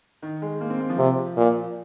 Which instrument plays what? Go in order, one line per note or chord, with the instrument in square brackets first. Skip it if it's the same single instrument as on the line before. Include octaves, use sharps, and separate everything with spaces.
[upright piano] D#3
G#3
A#3
C4
A#3
F3
[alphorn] C3
A#2